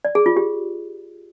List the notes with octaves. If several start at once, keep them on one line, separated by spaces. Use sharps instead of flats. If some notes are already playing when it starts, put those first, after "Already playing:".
D5
G#4
F4
G4